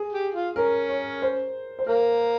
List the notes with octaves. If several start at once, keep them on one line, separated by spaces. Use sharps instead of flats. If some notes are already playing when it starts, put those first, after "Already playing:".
Already playing: G#4
G4
F4
C#4 A#4
C#5
C5
C5
A#3 A#4